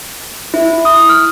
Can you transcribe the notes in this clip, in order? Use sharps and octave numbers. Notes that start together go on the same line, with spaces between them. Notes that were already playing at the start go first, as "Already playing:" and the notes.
E4
D#6
F6